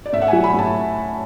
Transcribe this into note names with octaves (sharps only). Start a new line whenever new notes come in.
D5
A2 E5
F#5
F#3 G#5
B5
A2
A5